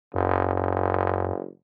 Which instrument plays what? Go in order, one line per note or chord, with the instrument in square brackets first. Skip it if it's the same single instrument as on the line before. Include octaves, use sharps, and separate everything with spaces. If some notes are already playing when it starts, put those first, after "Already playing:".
[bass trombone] F#1 [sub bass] F#2